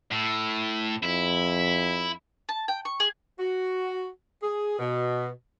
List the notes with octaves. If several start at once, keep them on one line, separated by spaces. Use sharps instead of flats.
A2
F2 E4
A5
G5
C#6
G#4
F#4
G#4
B2